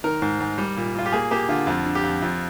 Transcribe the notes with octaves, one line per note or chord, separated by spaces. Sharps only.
D#3 A#4
G#2
G#2
G3
A#2
A#2 F4
G4
A#3 G#4
A#3 G4
D3 F4
F2 F4
D3
G4
F2
F2 F4